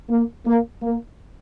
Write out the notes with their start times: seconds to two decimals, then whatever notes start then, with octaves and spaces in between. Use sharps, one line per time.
0.09 A#3
0.46 A#3
0.83 A#3